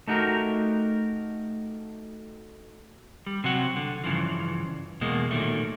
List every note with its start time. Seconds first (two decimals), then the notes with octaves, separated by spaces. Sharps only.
0.07 A3 D#4 F#4 G4 A#4
3.27 G3
3.44 C3 F#3 F#4
3.76 D3
4.04 G2 C#3 E3 F3
5.01 E2 B2 G#3 A#3
5.31 A#2 D#3 F#3 A3